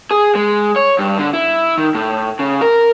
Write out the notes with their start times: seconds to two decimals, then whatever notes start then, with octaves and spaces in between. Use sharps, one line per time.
0.11 G#4
0.35 G#3
0.76 C#5
0.99 G2
1.18 D3
1.33 E4
1.77 D#3
1.95 A2
2.39 C#3
2.61 A#4